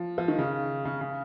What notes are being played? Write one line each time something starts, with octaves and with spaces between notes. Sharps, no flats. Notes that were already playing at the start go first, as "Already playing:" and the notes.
Already playing: F3
F3
D#3
C#3
C#3
C#3